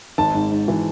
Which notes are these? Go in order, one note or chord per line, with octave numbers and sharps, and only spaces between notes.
G#1 A5
G#2
G#2
E3